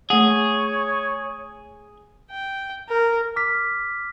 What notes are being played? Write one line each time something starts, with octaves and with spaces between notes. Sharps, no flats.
A3 G#4 C#5 F#5
G5
A#4
D6 F6 B6